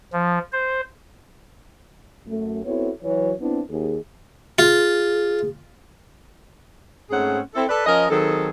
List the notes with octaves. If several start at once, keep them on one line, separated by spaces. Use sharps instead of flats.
F3
C5
F#2 A3
B3 C4 E4 F#4 A4 C#5
E3 F#3 C#5
B3 C4 D4 E4
D#2 G#4
F4 G#4
G#2 A3 C4 C#4 G#4 F#5
C4 E4 A4
A4 B4 D5
F3 C#4 A#4 D#5
D#3 F#3 C4 G#4 A4